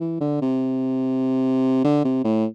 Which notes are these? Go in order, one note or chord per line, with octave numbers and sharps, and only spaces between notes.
E3
D3
C3
D3
C3
A2